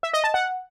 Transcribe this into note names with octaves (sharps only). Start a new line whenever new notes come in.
E5
D#5
A5
F#5